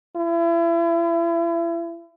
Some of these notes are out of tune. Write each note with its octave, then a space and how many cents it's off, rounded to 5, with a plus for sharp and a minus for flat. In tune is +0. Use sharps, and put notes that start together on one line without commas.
E4 +35